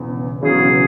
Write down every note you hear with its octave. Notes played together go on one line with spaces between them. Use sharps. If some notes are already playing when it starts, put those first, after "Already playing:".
Already playing: E1 E2 C#3
E1 E2 C#3 F#3 C#4 G#4